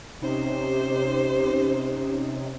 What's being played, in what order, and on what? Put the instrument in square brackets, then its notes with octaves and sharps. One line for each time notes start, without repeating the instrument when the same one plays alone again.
[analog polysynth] C3 C#4 D#4 [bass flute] G4 [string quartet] C5